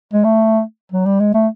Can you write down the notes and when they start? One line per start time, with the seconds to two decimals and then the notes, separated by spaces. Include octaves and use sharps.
0.13 G#3
0.24 A3
0.92 F#3
1.06 G3
1.20 G#3
1.34 A3